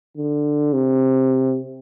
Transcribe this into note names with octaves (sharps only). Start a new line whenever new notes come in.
D3
C3